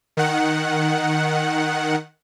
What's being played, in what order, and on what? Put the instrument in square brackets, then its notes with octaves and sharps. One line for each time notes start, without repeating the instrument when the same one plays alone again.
[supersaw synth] D#3 F#5